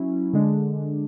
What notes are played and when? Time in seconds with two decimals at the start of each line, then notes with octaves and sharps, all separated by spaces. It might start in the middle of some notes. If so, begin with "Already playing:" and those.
Already playing: F#3 C#4 E4
0.33 D3 G#3 D4